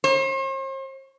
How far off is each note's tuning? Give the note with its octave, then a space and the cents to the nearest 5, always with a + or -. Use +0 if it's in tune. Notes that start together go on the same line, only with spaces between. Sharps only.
C5 +45